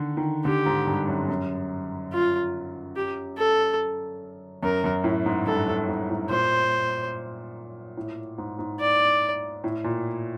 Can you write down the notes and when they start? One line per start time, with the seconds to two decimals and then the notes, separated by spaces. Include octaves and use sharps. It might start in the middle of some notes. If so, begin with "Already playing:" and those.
Already playing: D3 D#3
0.17 D#3
0.45 D3 G4
0.66 G#2
0.87 G2
1.08 F#2
1.28 F#2
2.13 F4
2.96 G4
3.37 A4
4.63 F#2 A#4
4.84 F#2
5.04 A2
5.26 G#2
5.46 G2 A4
5.67 G2
5.88 G#2
6.09 A2
6.29 A#2 C5
7.97 A2
8.38 G#2
8.59 G#2
8.80 D5
9.64 A2
9.84 A#2